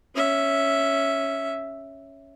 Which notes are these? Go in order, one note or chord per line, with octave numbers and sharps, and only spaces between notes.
C#4 E5